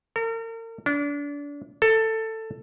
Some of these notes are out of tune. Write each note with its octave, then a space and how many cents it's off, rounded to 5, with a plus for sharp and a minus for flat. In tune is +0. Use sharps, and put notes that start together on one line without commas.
A#4 -40
D4 -30
A4 +15